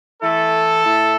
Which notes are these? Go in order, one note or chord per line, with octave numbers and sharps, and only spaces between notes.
E3 A3 E4 A4
A2 A3 E4